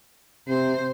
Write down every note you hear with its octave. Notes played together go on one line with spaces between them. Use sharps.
C3 C5